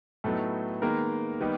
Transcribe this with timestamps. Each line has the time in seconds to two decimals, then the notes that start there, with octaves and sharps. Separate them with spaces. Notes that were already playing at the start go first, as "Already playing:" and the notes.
0.24 A2 F#3 A3 B3 D#4 A4
0.82 D#3 G#3 A#3 B3 A#4
1.41 D#3 G3 B3 D#4